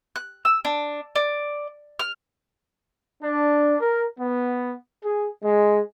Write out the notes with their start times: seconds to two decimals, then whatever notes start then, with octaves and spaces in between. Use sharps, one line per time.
0.16 F#6
0.45 E6
0.65 D4
1.16 D5
1.99 F6
3.23 D4
3.81 A#4
4.19 B3
5.04 G#4
5.43 G#3